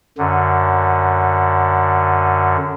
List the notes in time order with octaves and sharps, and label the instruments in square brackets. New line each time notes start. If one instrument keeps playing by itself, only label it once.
[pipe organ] F#2 D3